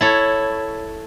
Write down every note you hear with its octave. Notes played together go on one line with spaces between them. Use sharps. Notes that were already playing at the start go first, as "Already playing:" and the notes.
E4 A4 C#5